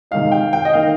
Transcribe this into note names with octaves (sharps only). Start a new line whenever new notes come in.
C3 D#3 G#3 D#4 F5
G5
G5
D#5
D#3 A#3 D#4 F5